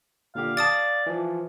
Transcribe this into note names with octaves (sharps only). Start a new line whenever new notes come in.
A#2 D3 G4 F5
D5 F5 A5 D6 D#6 A6
E3 F3